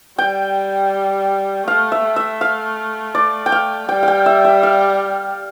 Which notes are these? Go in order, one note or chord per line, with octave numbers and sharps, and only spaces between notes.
G3 G5
A3 F5
E5
A3
E5
F5
D5
G5
F5
G3 G5
F5 G5
E5
E5
F5